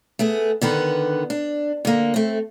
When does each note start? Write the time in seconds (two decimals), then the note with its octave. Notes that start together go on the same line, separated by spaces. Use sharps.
0.19 A3 B3 G#4
0.61 D3 D#3 B3 B4
1.30 D4
1.85 D3 A#3
2.14 A3 C4